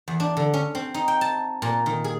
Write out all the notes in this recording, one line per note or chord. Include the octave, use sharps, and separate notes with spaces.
E2
D4
D3
C#4
C4
D#4
G5
A5
A#2
D#3
G#4